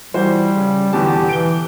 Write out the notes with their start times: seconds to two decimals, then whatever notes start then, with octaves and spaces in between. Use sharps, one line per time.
0.14 E3 G3 F#4 C5
0.57 C#3
0.93 E2 B2 D3 G4 A5
1.29 E3 D7 G7